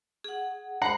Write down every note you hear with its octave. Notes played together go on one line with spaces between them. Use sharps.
G#4 F#5
G#3 C5 F#5 A#5 B5